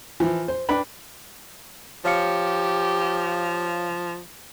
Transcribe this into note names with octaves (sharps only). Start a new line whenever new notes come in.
E3 F3
C5
D4 B4 G5 B5
F3 G4 C#5 F5 C#7